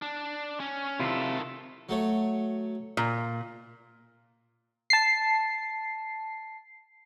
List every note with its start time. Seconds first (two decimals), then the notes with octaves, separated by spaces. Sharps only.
0.02 D4
0.60 C#4
1.00 C3 D#3 E4 F4 A4
1.89 F#3 A3 C#5
2.97 A#2
4.90 A5 C7